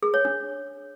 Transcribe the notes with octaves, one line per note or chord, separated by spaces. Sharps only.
G#4
C#5
D4